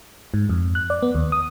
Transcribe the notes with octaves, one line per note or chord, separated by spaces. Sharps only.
G#2
F2
F#6
D5
B3
D#2
D#6